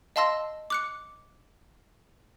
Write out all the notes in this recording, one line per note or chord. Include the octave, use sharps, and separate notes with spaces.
D#5 F5 A5 C6 E6 A#6
D6 F#6 C#7